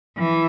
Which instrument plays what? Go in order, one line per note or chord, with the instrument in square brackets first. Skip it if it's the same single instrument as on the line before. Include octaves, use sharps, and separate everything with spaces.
[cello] E3